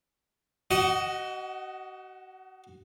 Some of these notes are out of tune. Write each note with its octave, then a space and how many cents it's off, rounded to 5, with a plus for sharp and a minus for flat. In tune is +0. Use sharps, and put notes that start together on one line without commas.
F#4 +35 D#5 +0 F#5 +0